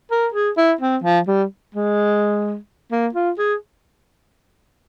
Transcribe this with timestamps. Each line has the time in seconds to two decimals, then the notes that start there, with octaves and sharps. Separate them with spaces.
0.11 A#4
0.34 G#4
0.57 E4
0.81 C4
1.04 F3
1.27 G3
1.75 G#3
2.92 A#3
3.14 F4
3.38 G#4